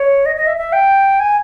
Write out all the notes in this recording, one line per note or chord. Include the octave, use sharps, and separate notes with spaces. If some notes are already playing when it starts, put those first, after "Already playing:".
Already playing: C#5
D#5
D#5
E5
E5
G5
G#5